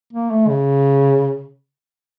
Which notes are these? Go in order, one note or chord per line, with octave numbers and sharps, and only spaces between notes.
A#3
A3
C#3